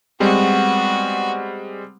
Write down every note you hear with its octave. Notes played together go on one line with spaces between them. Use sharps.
G3 G#3 B3 C4 F#4